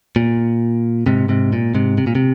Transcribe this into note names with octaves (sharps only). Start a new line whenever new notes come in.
A#2
G#2 C3
G#2 C3
A#2
G#2 C3
C3
A#2
C3